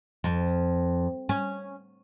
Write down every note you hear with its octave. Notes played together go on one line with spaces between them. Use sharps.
F2
C#4